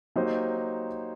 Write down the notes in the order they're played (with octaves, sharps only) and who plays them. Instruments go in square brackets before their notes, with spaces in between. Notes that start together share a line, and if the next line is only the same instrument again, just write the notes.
[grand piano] F#3 A#3 D#4 G4 C5